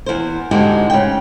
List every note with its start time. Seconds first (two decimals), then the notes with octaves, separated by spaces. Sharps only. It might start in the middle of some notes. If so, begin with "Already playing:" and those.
0.06 E2 C5
0.51 G#2 D3 G#3 F#4 G4
0.90 C#3 G5